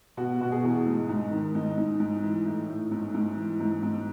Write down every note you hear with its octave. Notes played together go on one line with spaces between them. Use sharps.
B2 F#4
B2 F#4
G#4
E2
G#2
G#2 D#4
D#3
G#2 D#4
G#2
G#2
E3
A2
A2
G#2
G#2
E3
G#2
G#2